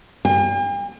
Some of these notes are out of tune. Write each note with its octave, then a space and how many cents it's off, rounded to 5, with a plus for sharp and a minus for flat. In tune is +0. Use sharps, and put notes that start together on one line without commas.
G5 +45